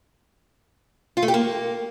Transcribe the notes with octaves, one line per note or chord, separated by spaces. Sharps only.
F4
A3
G4
A#3